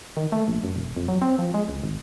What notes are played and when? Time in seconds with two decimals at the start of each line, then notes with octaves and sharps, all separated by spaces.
0.17 D#3
0.32 A3
0.48 A#1
0.64 F#2
0.76 E1
0.96 F2
1.08 F#3
1.22 C4
1.39 F3
1.54 G#3
1.68 C#2
1.84 G#1